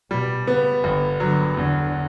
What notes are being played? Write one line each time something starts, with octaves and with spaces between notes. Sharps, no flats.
B2 G3
C#3 B3
G1 D3
D3 F#3
E2 D3